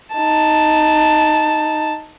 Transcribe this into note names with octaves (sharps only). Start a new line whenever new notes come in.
D#4 A5